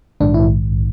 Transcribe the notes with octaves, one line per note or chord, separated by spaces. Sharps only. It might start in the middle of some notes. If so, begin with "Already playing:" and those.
A#1 G#2 D#3 D4
E4